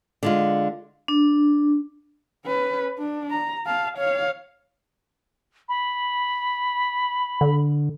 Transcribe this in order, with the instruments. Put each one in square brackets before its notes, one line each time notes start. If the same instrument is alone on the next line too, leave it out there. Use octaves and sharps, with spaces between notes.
[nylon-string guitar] D3 G#3 F4
[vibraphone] D4
[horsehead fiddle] C#4 B4
D4
A#5
F5 A5
C#5 F5
[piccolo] B5
[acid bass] D3